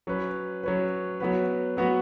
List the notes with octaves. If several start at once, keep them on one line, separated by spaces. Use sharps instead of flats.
F#3 C#4 B4
F#3 C#4 B4
F#3 B3 F#4 B4
F#3 B3 F#4 B4